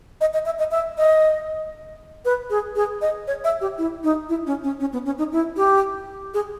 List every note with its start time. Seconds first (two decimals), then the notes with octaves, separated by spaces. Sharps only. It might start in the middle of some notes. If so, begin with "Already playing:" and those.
0.21 D#5
0.34 D#5
0.46 E5
0.59 D#5
0.71 E5
0.98 D#5
2.25 B4
2.50 G#4
2.76 G#4
3.02 D#5
3.27 C#5
3.44 E5
3.61 G4
3.78 E4
4.04 D#4
4.29 E4
4.47 C#4
4.64 C#4
4.80 C#4
4.93 B3
5.05 C#4
5.18 D#4
5.32 E4
5.57 G4
6.34 G#4